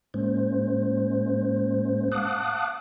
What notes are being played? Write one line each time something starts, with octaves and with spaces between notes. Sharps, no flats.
A2 G#3 A#3 C#4 C5
F5 F#5 A5 D6 D#6 F#6